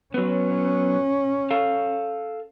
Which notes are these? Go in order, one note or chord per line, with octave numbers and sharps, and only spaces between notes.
F#3 B3 C#4
A4 F5